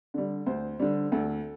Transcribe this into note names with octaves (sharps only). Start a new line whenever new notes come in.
D3 G3
D2 C5
D3 G3
D2 A4